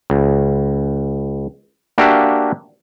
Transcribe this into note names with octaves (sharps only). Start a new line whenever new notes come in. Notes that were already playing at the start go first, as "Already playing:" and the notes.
C#2
A#3 D4 F#4 G4 E5 F5